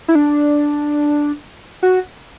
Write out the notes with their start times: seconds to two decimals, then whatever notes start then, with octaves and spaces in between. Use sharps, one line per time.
0.08 E4
0.15 D4
1.83 F#4